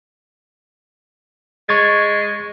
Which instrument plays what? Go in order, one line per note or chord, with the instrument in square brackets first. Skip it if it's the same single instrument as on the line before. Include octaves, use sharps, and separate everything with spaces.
[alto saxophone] G#3 [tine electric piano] C#6 G#6 A6